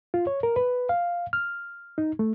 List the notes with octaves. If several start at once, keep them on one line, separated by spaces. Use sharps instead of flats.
F4
C#5
A#4
B4
F5
F6
D#4
A3